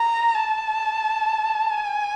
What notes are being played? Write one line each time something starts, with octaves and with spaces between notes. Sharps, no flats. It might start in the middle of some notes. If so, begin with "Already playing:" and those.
Already playing: A#5
A5
G#5